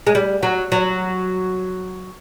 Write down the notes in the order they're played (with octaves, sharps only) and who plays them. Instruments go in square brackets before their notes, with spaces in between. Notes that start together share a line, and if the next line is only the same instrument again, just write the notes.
[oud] G#3
G3
F#3
F#3